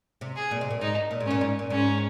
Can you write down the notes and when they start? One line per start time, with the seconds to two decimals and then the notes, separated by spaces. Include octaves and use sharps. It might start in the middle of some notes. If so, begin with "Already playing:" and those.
0.21 C3
0.36 G#4
0.51 A#2
0.61 C3
0.70 A#2
0.81 G#2 D#4
1.11 A#2
1.20 G#2
1.27 A#2 C#4
1.41 G#2
1.59 A#2
1.70 G#2 C#4